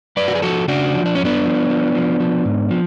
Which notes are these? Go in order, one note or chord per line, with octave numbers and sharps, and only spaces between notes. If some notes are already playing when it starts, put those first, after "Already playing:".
F#2 B4 D5
F#4
G#4
F3 F#4 A4
C#3 D4 F#4
F3
D4
F#2 C#4
B3 D4
F3
F3
F3
F3
G#2
F3